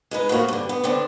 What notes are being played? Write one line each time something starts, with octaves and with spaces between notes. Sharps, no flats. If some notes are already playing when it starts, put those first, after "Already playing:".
G#3 D#4 B4
A2 F3 A#3 F#4
G2 D3
B3
D3 B3 C4 D4